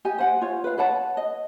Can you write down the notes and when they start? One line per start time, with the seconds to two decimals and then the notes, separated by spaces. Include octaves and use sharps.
0.05 G4 D#5 G#5
0.18 C5 F#5 G#5
0.42 F4 C#5
0.64 B4 F5
0.78 B4 C#5 F#5 A5
1.17 D#5